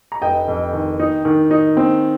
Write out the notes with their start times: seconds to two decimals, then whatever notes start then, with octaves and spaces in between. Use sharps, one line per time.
0.12 A#5
0.22 F1 D#5 G5
0.48 F2
0.73 D#3
0.99 D#4
1.25 D#3
1.51 D#4
1.77 C4